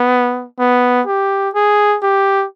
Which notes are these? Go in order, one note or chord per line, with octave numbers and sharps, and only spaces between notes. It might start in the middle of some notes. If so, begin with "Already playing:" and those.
Already playing: B3
B3
G4
G#4
G4